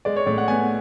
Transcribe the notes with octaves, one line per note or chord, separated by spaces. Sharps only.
G#3 D5
C#5
A2 D5
F#5
B3 G#5